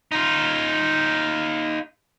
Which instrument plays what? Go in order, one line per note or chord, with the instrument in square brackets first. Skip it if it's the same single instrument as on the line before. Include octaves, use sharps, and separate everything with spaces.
[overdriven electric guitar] D#4 F4